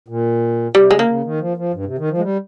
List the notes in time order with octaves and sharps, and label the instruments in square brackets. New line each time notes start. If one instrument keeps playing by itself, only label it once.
[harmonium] A#2
[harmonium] C3 [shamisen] G3
[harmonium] C#3 [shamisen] G#3
[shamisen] A#3
[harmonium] C#3
D#3
F3
F3
G2
C3
D#3
F3
G#3
G3